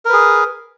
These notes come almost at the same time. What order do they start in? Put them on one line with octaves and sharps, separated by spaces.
A#4 B4 G#4